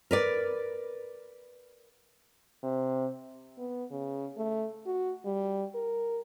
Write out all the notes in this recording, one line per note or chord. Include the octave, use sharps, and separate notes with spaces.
A#4 B4 D5
C3
B3
C#3
A3
F#4
G3
A#4